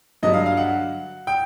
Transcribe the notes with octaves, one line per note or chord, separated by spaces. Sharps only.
G2 D3 F#3 D#5
F5
F5
F#5
G5